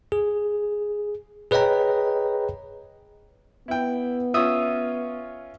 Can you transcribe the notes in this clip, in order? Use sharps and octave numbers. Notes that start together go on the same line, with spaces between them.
G#4
G#4 B4 C#5 D#5 G5 A#5
B3 E4 G5
C#4 F4 E5 D#6